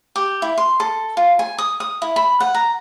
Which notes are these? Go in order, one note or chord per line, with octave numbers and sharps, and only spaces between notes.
G4
E4
C6
A4
F4
G#5
D#6
D#6
E4
B5
F#5
A#5